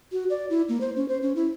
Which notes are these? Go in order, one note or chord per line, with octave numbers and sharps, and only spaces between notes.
F#4
D5
E4
A#3
C5
C#4
C5
C#4
E4